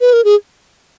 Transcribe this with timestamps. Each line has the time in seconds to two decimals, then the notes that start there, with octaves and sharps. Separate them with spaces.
0.01 B4
0.13 A#4
0.24 G#4